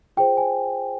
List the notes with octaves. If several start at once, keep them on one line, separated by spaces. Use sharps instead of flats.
F4 G#4 C5 G5
G#5